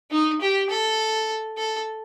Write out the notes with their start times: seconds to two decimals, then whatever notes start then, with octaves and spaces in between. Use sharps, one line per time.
0.11 D#4
0.41 G4
0.69 A4
1.58 A4